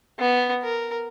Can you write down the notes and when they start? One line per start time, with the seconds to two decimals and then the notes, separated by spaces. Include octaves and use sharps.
0.19 B3
0.63 A#4